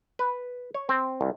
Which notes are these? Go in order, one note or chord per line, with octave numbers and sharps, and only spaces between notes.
B4
C#5
C4
C2